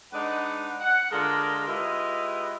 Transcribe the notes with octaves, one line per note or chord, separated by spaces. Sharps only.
G#3 D4 D#4 B4 F#5
F#5
D3 G#3 F4 A4 A#4
G#3 E4 F4 G4 B4 D#5